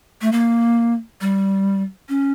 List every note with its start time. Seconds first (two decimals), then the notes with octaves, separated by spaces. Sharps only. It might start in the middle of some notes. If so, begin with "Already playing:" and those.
0.21 A3
0.32 A#3
1.21 G3
2.09 C#4